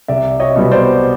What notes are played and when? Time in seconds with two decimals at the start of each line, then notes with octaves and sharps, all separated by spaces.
0.08 C2 D5 E5
0.40 C#5 D#5
0.56 B2 G3 B3
0.72 C5 D5